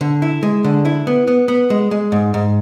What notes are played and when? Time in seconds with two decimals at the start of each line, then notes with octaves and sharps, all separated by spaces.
0.01 D3
0.22 E4
0.43 G#3
0.64 D3
0.85 E4
1.07 B3
1.27 B3
1.48 B3
1.70 G#3
1.91 G#3
2.12 G#2
2.34 G#2